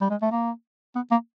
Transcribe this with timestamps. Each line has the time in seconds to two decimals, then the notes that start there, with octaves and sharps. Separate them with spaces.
0.01 G3
0.10 G#3
0.22 A3
0.31 A#3
0.95 B3
1.11 A#3